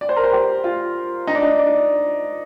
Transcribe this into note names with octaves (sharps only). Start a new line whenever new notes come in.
D5
C5
A#4
C5
G4
F4
D#4
D4
D#4
D4